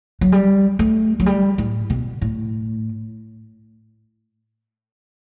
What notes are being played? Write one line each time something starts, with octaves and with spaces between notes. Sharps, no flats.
F#3
G3
A3
F#3
G3
A2
B2
A2